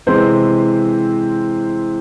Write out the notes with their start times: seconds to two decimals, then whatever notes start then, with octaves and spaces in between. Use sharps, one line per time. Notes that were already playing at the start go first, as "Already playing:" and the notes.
0.07 C3 E3 G#3 C4 C5